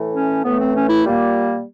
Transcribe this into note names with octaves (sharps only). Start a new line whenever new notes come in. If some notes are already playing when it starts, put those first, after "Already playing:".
Already playing: A2 E3 A3
C#4
A2 E3 A3 B3
C4
C#4
E4
A#2 G3 A#3